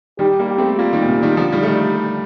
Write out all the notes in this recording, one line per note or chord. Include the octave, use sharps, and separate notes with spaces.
D#3 G3 G4
G3 A#3
G4
A3 C4
G3 A#3 F4
D#3 G3
A#2
C3
D#3 G3
D3 F3
D#3 G3
A3
D#3 G3